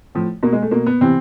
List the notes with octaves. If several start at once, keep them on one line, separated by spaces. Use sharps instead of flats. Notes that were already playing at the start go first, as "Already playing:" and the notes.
A2 F3
B2 A#3
G#3
A3
B2 A#3
B3
C3 E3 C4